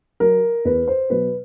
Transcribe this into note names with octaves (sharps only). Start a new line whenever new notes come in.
F#3 A#4
E2 B4
C5
B2 F#3 B4